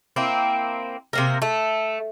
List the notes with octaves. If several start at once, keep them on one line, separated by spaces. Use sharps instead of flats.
A#3 C4 E4
C3 A#3 A#4
A3